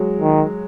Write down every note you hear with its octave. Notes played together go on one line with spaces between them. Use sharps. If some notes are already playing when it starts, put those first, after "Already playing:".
Already playing: F#3 G#3
D#3